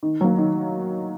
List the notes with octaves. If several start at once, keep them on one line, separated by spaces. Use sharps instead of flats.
D#3
F#3 A#3
D#3